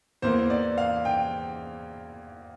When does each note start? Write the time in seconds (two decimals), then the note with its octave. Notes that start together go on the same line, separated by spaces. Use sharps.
0.22 E2 E3 A#3 C5
0.50 D5
0.78 F5
1.05 G5